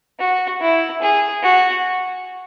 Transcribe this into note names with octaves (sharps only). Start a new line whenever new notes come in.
F#4
E4
G#4
F#4